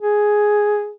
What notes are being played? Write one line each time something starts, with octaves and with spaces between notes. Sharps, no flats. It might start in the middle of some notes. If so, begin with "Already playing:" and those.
G#4